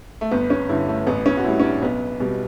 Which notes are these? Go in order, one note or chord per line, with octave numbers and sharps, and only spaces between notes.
A3
G1 B3
C#4
G2 D3 E4
A3
A1 B3
C#4
F#4
A2 G3 E4
C#4
D4
B1 B3
B2 G3